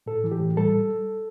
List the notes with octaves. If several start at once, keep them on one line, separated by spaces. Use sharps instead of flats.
A2 A4
E3
G4
A2
G3 A4